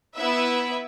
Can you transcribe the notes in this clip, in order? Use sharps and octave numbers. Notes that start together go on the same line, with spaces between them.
B3 E4 B4 E5